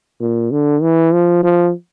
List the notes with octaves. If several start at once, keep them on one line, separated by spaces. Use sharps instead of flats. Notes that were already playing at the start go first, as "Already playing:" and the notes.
A#2
D3
E3
F3
F3